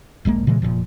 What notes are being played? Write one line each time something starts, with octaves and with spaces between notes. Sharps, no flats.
D#1 A#1 G#3 A#3
A#2 C#3 E3 G#3
F1 C#2 A#2 F3